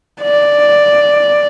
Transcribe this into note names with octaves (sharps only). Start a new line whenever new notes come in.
D5